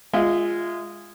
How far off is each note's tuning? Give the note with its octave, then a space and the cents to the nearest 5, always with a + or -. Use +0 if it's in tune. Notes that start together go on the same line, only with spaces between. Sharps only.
G#3 -10 F4 +0 E5 +0